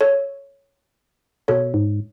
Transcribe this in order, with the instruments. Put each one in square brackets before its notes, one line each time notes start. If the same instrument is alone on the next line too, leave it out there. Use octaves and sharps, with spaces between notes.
[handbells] A4 C#5
[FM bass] B2 [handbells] A4 C#5
[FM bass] G#2